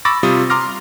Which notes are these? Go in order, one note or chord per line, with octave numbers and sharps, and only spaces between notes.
B5 C#6 D6 E6 A6 A#6
C3 G3 F4 D#6
A#5 C6 D6 F6 A#6